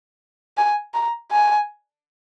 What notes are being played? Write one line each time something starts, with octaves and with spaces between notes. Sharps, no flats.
G#5
A#5
G#5